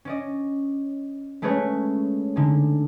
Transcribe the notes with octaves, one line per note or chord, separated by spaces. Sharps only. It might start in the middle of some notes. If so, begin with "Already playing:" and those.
C#4 D5 D#5
G#3 A3 C#4 G#4 B4 C#5
D3 D#4 G#4